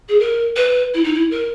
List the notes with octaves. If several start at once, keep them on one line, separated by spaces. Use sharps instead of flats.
G#4
A#4
B4
E4
D#4
E4
A#4